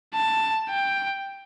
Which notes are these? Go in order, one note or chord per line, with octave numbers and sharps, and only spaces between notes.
A5
G5